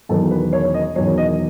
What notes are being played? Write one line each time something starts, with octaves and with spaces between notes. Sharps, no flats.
E1 E2 D#3 F#3 A4
B4
C#5
D#5
E1 E2 D#3 F#3 C#5
D#5